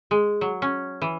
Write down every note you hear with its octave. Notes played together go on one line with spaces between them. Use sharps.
G#3
F#3
C#4
E3